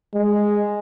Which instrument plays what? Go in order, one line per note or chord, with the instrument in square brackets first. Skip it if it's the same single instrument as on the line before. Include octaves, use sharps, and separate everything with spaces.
[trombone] G#3